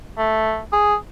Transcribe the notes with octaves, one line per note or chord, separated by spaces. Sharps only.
A3
G#4